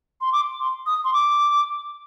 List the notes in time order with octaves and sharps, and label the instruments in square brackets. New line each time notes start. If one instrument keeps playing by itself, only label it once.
[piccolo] C6
D6
C6
D#6
C6
D6